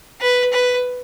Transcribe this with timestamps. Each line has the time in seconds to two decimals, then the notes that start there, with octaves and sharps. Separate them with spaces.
0.21 B4
0.53 B4